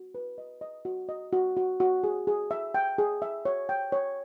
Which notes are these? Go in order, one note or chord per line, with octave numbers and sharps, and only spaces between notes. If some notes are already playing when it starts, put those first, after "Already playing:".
Already playing: F#4
B4
D#5
D#5
F#4
D#5
F#4
F#4
F#4
G#4
G#4
E5
G5
G#4
E5
C#5
G5
C#5